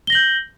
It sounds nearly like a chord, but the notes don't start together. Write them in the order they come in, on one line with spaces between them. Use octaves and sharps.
G7 A#6 F#7 G6